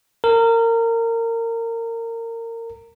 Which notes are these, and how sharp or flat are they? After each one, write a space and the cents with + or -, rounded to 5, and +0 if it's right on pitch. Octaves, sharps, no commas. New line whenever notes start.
A#4 -25